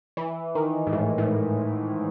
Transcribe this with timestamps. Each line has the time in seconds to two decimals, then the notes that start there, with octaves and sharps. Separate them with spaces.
0.17 E3
0.55 D#3
0.87 G#2
0.92 A2
1.18 A2